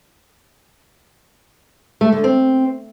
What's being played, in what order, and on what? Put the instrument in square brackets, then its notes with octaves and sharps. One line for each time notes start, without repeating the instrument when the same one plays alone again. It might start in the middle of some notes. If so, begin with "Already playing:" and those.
[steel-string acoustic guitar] A3
D3
C4